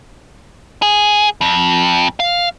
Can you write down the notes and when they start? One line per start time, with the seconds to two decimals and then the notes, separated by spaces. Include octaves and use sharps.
0.82 G#4
1.41 F2
2.20 F5